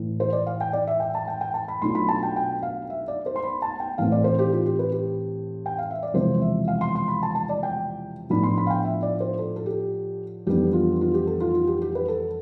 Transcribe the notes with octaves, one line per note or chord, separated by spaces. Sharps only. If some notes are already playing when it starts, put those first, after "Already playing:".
Already playing: A2 E3 A3
C5
D5
F5
G5
D5
E5
G5
A5
G5
G5
A5
B5
B1 B2 A3 D4 F4 C6
B5
A5
G5
G5
F5
E5
D5
C5
C6
B5
A5
G5
A2 E3 A3 C4 F5
D5
C5
G4
F4
G4
B4
G4
G5
F5
E5
D5
E1 E2 C3 F3 C5
E5
F5
C6
C6
B5
A5
A5
D5
G5
A2 F3 B3 D4 F4 B5
C6
B5
F5
G5
E5
D5
C5
A4
A4
G4
F2 E3 G3 B3 D4 G4
F4
F4
G4
A4
F4
F4
G4
G4
B4
A4